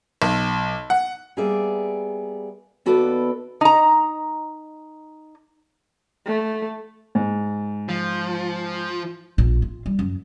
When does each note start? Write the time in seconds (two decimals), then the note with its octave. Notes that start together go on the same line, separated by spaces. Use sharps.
0.22 B1
0.90 F#5
1.37 G3 A#3 B3 G#4 D5 E5
2.86 D#2 B3 F#4 A4 B4 D5
3.61 D#4 A#5
6.26 A3
7.15 G#2
7.89 F3
9.38 A#1
9.62 F4
9.86 G3
9.99 F#2